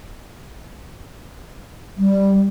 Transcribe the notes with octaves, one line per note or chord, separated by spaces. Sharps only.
G3